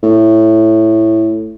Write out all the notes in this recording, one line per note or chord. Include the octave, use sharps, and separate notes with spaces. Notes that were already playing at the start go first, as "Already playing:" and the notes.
A2